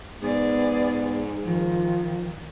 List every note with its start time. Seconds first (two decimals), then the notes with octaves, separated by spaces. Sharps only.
0.22 G#2 B3 G#4 D5
1.44 D#3 F3